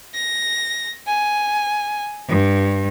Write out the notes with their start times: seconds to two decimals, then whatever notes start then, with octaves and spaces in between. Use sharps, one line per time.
0.14 A#6
1.06 G#5
2.27 G2